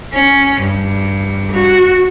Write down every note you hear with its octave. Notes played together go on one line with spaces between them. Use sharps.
C#4
G2
F#4